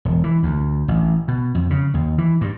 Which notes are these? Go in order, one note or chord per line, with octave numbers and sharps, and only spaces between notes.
E1
E3
D2
A1
B2
F2
C#3
D#2
E3
G2